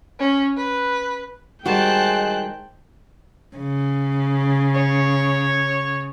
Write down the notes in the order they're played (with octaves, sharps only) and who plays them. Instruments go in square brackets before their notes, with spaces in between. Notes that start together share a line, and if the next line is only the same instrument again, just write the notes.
[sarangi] C#4
B4
[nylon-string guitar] D#3 G3 F#4 [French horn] G#3 [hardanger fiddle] C5 A5 [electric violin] G5 F#6
[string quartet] C#3
[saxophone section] C#5